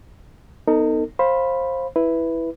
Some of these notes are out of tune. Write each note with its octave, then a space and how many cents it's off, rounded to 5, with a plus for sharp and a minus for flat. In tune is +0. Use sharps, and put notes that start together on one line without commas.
B3 +5 D#4 +0 A4 +40
C5 +20 F5 +0 B5 +0
E4 +0 B4 +0